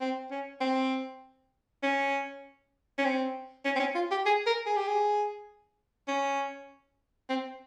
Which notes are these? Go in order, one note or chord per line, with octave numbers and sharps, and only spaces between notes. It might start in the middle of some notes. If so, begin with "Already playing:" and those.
C4
C#4
C4
C#4
C#4
C4
C#4
C4
C#4
F4
G4
G#4
A#4
G#4
G4
G#4
C#4
C4